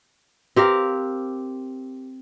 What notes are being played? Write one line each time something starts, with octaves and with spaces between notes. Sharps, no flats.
C4 G4 A#4 F5